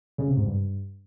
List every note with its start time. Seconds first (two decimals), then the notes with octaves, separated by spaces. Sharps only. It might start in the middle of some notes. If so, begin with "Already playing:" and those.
0.18 C#3
0.27 C3
0.36 G#2
0.46 G2